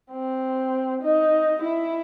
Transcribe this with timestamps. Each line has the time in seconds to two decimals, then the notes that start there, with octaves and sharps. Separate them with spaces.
0.11 C4
1.02 D#4
1.62 E4